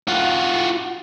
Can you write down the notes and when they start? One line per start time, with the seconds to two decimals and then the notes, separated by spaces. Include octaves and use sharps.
0.08 F4 F#4